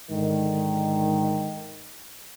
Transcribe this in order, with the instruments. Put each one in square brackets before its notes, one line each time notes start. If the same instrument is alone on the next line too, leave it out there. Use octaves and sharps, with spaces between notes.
[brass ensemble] G#2 D3 D#3